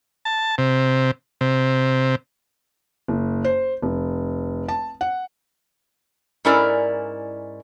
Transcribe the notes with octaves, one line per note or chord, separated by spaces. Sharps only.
A5
C3
C3
F#1
C5
F1
A5
F#5
G#2 C#4 E4 A#4 D5